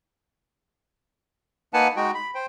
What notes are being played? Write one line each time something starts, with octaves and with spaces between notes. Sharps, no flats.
A#3 D#4 B4 F#5 G#5 A5
G#3 D#4 F#4 G5
B5
C5 G5